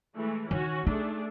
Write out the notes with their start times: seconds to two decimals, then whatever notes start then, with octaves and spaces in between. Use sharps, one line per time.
0.16 E3 G#3 A3
0.51 D#3 C#4 F#4
0.87 A3 D4 D#4 G#4